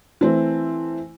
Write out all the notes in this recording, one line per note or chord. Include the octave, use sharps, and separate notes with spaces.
E3 A3 C4